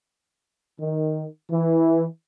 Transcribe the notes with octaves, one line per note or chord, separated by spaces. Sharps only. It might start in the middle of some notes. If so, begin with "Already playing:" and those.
D#3
E3